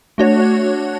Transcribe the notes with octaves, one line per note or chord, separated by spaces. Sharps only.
A3 D4 F#4 C#5